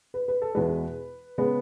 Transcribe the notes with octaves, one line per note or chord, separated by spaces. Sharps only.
B4
B4
A4
E2 B2 G#3 B4
C#3 G#3 B3